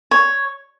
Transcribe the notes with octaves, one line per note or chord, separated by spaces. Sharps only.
C#5